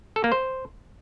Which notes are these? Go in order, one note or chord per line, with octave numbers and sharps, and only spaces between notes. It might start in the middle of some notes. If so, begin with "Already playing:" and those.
A4
A#3
C5